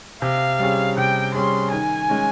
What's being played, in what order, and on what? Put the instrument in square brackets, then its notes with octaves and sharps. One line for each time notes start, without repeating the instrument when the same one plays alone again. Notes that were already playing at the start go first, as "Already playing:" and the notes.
[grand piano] C3 [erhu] F5
[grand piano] G3 C#4 G#4
[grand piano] C3 [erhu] G5
[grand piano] G3 C#4 G#4 [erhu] C6
[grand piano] D#3 [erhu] G#5
[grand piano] G#3 C#4